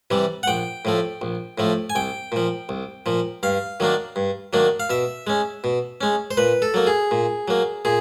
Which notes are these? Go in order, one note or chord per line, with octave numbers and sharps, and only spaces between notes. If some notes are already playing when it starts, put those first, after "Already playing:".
C3 E3 G3
F#5
A#1 G5
A2 F3 A3
A#1
A2 F3 A3
G#5
C2 G5
A#2 F3
C2
A#2 F3
G2 F5
D#3 F#3 A#3 D4
G2
D#3 F#3 A#3 D4
F5
B2 E5
G#3 C#4
B2
G#3 C#4
C5
A#2 B4
A4
F#3 A#3
G#4
A#2
F#3 A#3
A#2 G#4